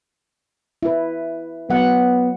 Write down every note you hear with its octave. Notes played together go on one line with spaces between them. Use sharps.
E4 B4
F#3 B3 F#5